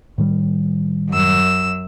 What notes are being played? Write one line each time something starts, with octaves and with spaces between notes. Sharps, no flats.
A2 D#3 G3
F#2 E6